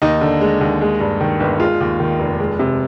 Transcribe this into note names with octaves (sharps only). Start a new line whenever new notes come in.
D#2 D#4
D3
G#3
D#2
G#3
G2
D#3
G1
G#3 F4
D#2
D#3
F1
G#3
C3